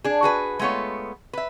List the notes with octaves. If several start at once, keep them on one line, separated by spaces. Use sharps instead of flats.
D4 G#4
F#4 G#4 B4
G#3 A3 B3 F4 C#5
B4 E5